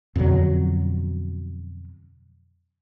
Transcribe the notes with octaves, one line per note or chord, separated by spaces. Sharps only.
F2 B2 D3 F#3